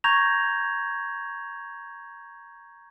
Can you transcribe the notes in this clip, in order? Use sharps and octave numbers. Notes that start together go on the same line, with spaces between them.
A#5 C#6 G6 G#6 A#6 F7